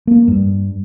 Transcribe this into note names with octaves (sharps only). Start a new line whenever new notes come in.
A#3
G2